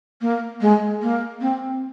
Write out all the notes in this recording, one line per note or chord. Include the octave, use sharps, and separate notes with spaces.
A#3
G#3
A#3
C4